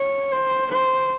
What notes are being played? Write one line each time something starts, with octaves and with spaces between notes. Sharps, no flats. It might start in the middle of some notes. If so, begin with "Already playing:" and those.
Already playing: C#5
C5
C5